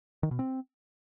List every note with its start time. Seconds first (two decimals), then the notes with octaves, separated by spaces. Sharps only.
0.23 D#3
0.31 B2
0.39 C4